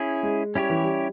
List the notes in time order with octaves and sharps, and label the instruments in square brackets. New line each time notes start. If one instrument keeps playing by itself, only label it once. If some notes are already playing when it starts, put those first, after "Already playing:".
Already playing: [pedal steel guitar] C#4 E4 G#4
[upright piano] G#3
[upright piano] G3 [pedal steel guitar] C#4 E4 G4 C#5
[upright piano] E3
G3